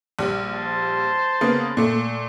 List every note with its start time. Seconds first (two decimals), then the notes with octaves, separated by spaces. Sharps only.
0.19 A#1 G3
0.54 C5 A5
1.41 C#3 A#3 B3
1.77 A#2 A3